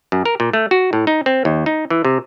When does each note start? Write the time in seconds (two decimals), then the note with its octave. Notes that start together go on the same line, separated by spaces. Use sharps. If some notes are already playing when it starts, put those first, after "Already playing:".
0.12 F#2
0.25 A#4
0.40 A#2
0.53 A3
0.71 F#4
0.93 A2
1.07 D#4
1.26 C4
1.45 D#2
1.66 D#4
1.90 E3
2.05 C3